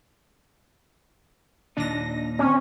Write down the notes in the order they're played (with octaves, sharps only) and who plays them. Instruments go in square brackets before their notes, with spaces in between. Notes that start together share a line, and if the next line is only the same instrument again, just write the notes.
[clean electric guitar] D#2 A#2 D#4 [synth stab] D4 A#6
[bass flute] C4 [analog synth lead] C#4